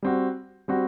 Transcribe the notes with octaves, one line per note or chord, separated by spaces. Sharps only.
G3 C4 F#4
G3 C4 F#4